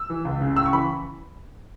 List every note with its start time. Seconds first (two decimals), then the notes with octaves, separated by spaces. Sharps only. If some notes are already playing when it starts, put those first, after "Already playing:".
Already playing: E6
0.10 E3
0.25 C#2
0.41 C#3
0.56 A2 E6
0.66 C#6
0.73 E3 B5